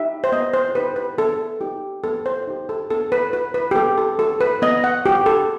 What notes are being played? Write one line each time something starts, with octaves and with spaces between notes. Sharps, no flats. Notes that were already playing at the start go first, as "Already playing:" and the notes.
Already playing: D#4 G4 E5
C5
B3 D#5
C5
D#4 G4 B4
B4
B3 A4
D#4 G4
B3 A4
C5
D#4 G4
A4
B3 A4
B4
F#4 B4
B4
G4
B3 A4
A4
F#4 A4
B4
B3 D#5
F#5
F#4 G4
A4